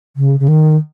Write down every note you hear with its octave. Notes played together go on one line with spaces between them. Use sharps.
C#3
C#3
D#3